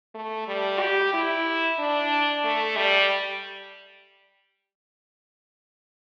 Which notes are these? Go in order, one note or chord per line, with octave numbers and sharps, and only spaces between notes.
A3
G3
G4
E4
D4
A3
G3